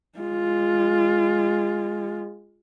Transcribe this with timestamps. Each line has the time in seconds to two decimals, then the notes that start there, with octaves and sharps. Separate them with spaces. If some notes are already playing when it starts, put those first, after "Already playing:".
0.19 G#3 F4